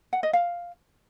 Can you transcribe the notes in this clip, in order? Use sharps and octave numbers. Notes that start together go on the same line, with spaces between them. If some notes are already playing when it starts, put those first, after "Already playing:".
F#5
D#5
F5